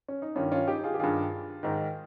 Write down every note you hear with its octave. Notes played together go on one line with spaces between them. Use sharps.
C#4
D#4
G2 D#3 C#4 F4
C#4 F4
D#4 G4
F4 G#4
G4
G2 D#3 F4 G#4
G#2 D#3